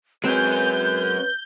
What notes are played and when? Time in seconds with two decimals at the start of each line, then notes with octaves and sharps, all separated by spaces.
0.24 F#3 G#3 C4 C#4 B4 G6